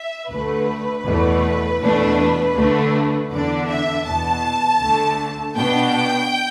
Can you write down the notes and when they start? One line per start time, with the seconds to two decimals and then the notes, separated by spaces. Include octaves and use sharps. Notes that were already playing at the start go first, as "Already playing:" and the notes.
Already playing: E5
0.29 D2 D3 A3 B4
1.05 E2 B2 A3
1.80 E2 B2 A3 D4
2.55 D2 D3 A3 D4
3.30 E2 D3 B3 D4 D5
3.68 E5
4.05 E2 B2 B3 A5
4.80 D2 D3 A3
5.56 B2 B3 D4 G5